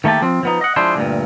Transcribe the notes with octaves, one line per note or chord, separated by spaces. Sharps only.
D#3 A3 A#3 G4 A5
F3 C4
F3 B3 D#4
D#5 F#5
F3 G#3 D4 E4 C5
D2 G2 A#2